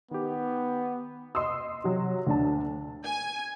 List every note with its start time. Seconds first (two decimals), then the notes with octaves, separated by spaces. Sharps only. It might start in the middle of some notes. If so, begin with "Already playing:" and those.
0.11 D#3 B3 G4
1.35 D#5 C6 D#6 E6
1.84 C3 F#3
2.27 D2 D4 A5
3.05 G#5